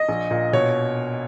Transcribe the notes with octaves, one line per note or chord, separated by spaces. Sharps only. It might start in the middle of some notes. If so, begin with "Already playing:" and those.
Already playing: D#5
A#1
A#2
B2 C#5